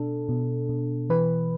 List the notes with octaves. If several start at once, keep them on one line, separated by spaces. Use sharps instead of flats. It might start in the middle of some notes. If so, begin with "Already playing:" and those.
Already playing: B2 D4 A4
B2
B2
E3 B4